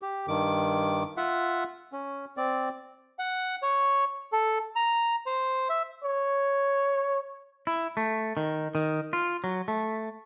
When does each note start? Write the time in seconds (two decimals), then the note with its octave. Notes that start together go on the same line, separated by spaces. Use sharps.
0.02 G4
0.28 G2 D#3 D6
1.17 F4 E5 F#5
1.93 C#4
2.37 C4 D5
3.19 F#5
3.62 C#5
4.32 A4
4.76 A#5
5.26 C5
5.69 E5
6.04 C#5
7.67 E4
7.97 A3
8.37 D#3
8.75 D#3
9.13 F4
9.44 F#3
9.68 A3